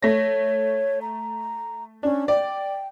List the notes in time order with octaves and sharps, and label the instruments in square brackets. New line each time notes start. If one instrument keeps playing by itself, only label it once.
[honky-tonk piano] A3 A#6 [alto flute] C#5
[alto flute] A#5
[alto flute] C#4 [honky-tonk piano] D4
[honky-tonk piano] D5 [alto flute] G5